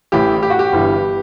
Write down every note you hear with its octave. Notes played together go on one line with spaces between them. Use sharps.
A1 A2 E3 G4
G4
F#4
G4
G1 G2 E3